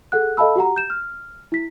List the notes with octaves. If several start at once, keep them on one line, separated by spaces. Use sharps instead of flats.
G#4 A4 F#5 F#6
A4 D#5 F5 A5 B5 E6
F#4 G4 F#5 A#5
G6 E7
F6
E4 B6